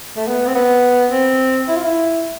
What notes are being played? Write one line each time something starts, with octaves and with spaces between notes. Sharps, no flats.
A3
B3
C4
B3
C4
E4
F4
E4